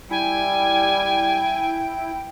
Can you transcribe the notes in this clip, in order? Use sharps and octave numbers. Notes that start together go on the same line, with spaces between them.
G3 E4 G5 G#5